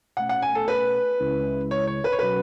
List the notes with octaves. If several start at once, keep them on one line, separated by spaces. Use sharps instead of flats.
B2 A3 C#4 F#5
F#5
G#5
A4
B4
C#2 C#3 G#3 C#4 E4
C#5
C#5
B4
C#5
B2 F#3 C#4 F#4 B4